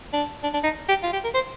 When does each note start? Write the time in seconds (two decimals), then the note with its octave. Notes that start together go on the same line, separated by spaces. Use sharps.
0.13 D4
0.43 D4
0.54 D4
0.64 D#4
0.89 G4
1.04 F4
1.13 G4
1.24 A#4
1.35 C5